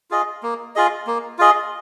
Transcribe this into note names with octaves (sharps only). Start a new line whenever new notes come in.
F4 G#4 D#5
A#3
F4 G#4 D#5
A#3
F4 G#4 D#5